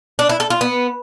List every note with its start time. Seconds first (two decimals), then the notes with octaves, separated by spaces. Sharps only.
0.19 D4
0.29 E4
0.40 A4
0.50 F4
0.61 B3